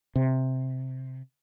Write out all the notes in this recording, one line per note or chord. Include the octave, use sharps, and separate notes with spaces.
C3